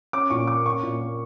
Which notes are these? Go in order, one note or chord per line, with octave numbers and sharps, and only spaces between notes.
C#4 D6
A#2 C#6
A#3 D6
C#4 C#6
A#2
A#3